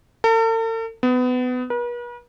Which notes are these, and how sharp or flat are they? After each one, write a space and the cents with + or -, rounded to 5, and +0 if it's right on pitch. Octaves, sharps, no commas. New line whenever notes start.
A4 +45
B3 +25
B4 -45